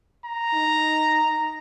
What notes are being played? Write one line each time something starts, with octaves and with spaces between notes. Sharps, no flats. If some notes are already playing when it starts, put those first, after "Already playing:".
A#5
D#4